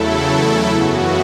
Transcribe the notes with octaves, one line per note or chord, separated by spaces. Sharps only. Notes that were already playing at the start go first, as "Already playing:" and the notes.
Already playing: E2 C#3 F#3 A3 E4 A4
F#2 C#3 E3 B3 F#4